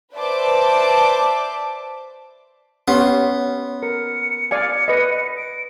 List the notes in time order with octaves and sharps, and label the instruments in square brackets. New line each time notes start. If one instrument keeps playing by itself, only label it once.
[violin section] B4 C5 D5 E5 A5 D6
[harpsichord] B3 [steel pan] C#4 G4 C6
[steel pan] A#4 [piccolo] C#7
[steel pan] D5 F5 G#5
B4 D#5
[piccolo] D7